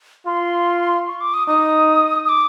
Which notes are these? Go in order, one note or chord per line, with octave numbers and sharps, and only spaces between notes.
F4 C6
C#6
D6
D#6
D#4 D#6
D#6
D6